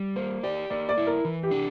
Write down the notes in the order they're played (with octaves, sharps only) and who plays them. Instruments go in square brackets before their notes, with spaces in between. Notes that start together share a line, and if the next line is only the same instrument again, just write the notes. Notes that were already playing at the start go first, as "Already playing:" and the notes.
Already playing: [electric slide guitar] G3
[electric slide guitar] A#3 [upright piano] C5
[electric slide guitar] G4 [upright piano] D5
[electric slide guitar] A#3 [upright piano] D5
[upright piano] D5
[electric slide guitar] E4
[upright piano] A#4
[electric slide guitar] E3
[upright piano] G4
[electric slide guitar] D4